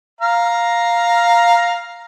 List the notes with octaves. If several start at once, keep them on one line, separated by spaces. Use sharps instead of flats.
F5 A#5